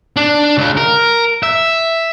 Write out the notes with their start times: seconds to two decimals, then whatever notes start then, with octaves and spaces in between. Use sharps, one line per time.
0.16 D4
0.58 C#2
0.77 A#4
1.43 E5